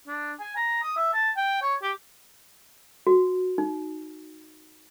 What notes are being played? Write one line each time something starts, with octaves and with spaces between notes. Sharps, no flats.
D4
G#5
A#5
D#6
E5
A5
G5
C#5
G4
F#4
D#4